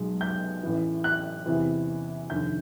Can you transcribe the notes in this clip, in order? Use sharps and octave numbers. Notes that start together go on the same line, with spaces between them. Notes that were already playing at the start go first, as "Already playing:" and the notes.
Already playing: B1 B2 G#3
G6
A1 A2 E3
F#6
E2 C3 E3
F1 D#2 D3 G6